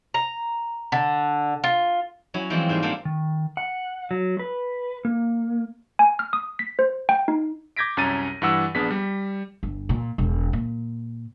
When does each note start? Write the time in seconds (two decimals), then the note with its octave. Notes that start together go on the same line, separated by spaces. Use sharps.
0.14 A#5
0.92 D3
1.64 F4
2.34 F#3 C#4 E4
2.50 E3 F3 G3 G#3 C4
2.69 G#2 G3 A#3 F4
2.82 A#3 C4 D4 A4 F5 F#5
3.05 D#3
3.57 F#5
4.11 F#3
4.39 B4
5.05 A#3
5.99 G#5
6.19 F6
6.33 D#6
6.59 B6
6.79 C5
7.09 G5
7.28 D#4
7.77 D6 G6 G#6 A#6 B6 D7
7.97 C2 F#2 C#4 A#5 A6 D#7
8.42 G2 E3 F#5 E6
8.75 A#1 B3 D4 G#4 B6
8.91 G3
9.63 G1
9.89 A#2
10.18 E1
10.53 A#2